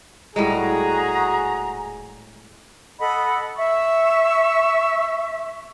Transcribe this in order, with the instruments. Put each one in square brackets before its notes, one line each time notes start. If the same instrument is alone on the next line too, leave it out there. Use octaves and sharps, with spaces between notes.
[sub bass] D#1 [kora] A2 G3 G#3 [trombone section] F#4 G#4 [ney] A#5
[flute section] A4 D#5 F#5 B5
E5 C#6